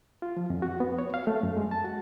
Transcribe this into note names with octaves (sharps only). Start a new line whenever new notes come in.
F4
F3
F2
F#4
B3
C#5
F5
A3
F#2
G#3
A5
F#4